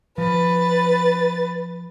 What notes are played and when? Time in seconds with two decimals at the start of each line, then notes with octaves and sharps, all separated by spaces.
0.18 F3 B4 A6